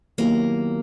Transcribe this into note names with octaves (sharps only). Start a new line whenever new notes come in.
D#3 F#3 A#3 B3 E4 G4